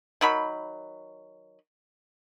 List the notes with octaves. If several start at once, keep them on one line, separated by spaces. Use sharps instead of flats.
D#3 F#3 B5